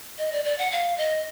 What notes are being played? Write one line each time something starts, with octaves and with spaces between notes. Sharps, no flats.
D#5
D5
D5
F#5
F5
D#5